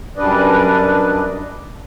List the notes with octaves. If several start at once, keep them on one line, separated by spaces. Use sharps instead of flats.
F#2 G3 D4 B4 D5 D#5